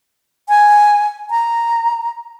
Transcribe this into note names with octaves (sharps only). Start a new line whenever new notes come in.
G#5
A#5